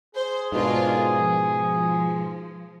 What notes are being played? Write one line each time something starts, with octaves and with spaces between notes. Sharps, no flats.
G#4 C5
G#2 B2 D4 F4 A#4
F3